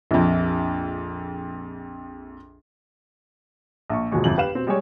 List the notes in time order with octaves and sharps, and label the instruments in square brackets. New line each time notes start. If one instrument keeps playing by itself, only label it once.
[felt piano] A#1 F2
[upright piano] A#1 C#6
E1 D#2 B2 F3 G#3 C#6
G1 F2 F#7
G4 B4 F5 E7
B2 C4
G3 G#3 G4 G#4 C#5